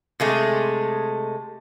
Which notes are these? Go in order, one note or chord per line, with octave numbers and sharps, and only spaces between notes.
C3 G#3 A3